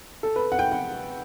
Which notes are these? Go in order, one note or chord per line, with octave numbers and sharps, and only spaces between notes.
A4
B4
F#5
G5
F#5